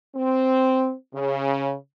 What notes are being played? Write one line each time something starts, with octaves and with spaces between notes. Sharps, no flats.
C4
C#3